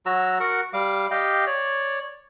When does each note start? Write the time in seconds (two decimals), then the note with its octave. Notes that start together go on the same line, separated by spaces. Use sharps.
0.06 F#3 F#4 A#5 E6
0.40 F#4 A#4 F#5
0.73 G3 F5 D6
1.11 G4 D#5 F5 G5
1.47 C#5 D5